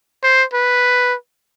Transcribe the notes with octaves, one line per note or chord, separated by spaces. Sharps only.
C5
B4